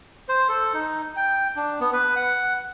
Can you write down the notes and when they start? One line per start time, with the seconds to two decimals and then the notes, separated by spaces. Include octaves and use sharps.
0.29 C5
0.49 A4
0.74 D#4
1.16 G5
1.56 D4
1.80 B3
1.93 B4
2.16 F#5